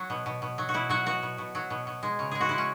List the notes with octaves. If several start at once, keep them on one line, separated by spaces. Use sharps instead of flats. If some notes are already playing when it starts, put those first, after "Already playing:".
Already playing: F#3
B2
B2
B2
F#3
F#4
B2 E4
F#3 F#4
B2 F#4
B2
B2
F#3
B2
B2
G#3
C#3
G#3 G#4
F#4
G#3 E4
C#4